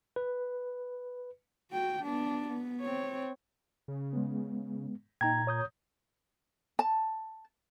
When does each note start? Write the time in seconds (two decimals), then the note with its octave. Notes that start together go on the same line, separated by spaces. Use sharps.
0.16 B4
1.72 F#4 G5
2.03 B3 D4
2.48 B3
2.81 C4 C#5
3.88 C#3
4.13 G#3 B3
5.21 A#2 D#4 G5 A#5 G#6
5.47 C#5 D#6 G6
6.79 A5